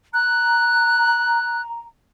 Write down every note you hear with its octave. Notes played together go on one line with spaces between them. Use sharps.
A#5 F#6